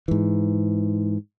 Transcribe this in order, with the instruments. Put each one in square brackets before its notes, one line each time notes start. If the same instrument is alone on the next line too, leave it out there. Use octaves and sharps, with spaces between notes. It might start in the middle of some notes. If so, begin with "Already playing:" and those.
[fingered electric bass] G#2 E3